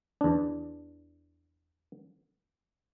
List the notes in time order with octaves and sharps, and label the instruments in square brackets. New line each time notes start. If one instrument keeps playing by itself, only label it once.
[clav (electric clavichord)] E2 D4